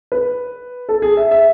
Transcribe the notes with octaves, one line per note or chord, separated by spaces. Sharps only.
B4
A4
G#4
E5
E5